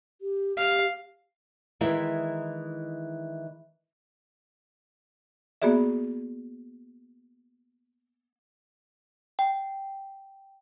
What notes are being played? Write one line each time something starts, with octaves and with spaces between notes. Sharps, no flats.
G4
G4 F5
D#3 E3 G#3 E4 E5
A#3 B3 F#4 G#4 D5 E5
G5